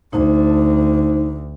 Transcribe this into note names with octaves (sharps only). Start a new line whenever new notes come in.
D2 A3 D#4 C5